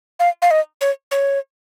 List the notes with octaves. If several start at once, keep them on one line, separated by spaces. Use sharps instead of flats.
F5
F5
D#5
C#5
C#5